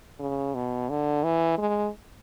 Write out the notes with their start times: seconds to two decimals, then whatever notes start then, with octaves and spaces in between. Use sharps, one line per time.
0.19 C#3
0.55 B2
0.90 D3
1.24 E3
1.58 G#3